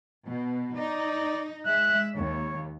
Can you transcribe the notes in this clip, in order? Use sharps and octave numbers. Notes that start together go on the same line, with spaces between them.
B2
D#4 D5
G#3 E5 F#6
D#2 C#5